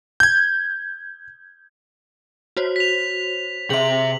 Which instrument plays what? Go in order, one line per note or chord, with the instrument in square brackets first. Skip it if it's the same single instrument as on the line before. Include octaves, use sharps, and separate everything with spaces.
[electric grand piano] G6 G#6
[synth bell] F#4 C5 C#5
[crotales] B6 F7
[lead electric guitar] C3 E5 [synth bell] G#4 C6 [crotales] F#7